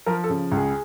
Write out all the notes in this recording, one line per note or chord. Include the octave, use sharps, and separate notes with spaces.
F3 A#4
A4
C#3
C#2
G#4